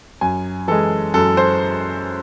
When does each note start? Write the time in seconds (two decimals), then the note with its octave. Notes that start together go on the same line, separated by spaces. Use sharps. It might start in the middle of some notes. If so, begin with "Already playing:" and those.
0.21 F#2 G#5
0.68 E3 G#3 A4
1.14 F#2 A4
1.37 C5